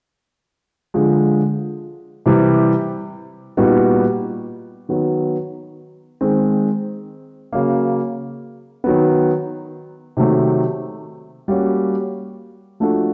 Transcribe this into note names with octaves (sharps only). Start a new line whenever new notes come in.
D3 F3 G#3
C3 E3 G3
A#2 G3 B3 D#4 F#4
D#3 F#3 B3
D#3 G#3 C4
C#3 F#3 A#3
D#3 F#3 B3
C3 D#3 F#3 A3
G3 A#3 C#4 F#4
F3 A3 D4 F#4 A4